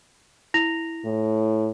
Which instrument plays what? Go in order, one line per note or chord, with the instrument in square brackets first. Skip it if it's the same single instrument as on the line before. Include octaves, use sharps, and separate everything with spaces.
[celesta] E4 A#6 F7
[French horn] A2